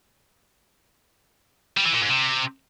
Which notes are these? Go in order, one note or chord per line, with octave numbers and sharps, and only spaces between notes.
G3
E3
A#2
G#2
C3